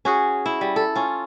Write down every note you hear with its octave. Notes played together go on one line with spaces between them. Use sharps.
C#4 F#4 G#4
E4
G3
A4
C#4 F4